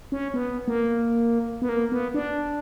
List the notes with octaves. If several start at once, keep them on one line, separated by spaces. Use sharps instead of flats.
C#4
B3
A#3
B3
A#3
B3
D4